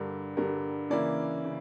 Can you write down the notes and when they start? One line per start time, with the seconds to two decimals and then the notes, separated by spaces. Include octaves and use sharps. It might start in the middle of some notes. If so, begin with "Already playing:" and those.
Already playing: G2 D3 G3 A#4
0.37 G2 D3 G3 A#4
0.90 C#3 E3 A#3 E4 D5
1.45 C#3